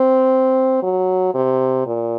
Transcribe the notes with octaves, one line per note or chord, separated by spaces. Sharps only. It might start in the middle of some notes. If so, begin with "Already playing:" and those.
Already playing: C4
F#3
C3
A#2